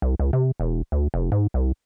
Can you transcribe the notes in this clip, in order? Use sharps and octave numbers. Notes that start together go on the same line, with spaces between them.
C2
C#2
C3
E1
D2
F1
G#2
C2